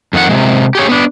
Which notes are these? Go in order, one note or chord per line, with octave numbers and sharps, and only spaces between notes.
F2 D#3 F4 F#5
C3 D#3 G#3
G4 G#4 C#5
B3 D4